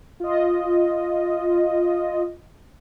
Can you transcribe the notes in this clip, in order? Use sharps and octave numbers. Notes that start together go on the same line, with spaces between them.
F4 D#5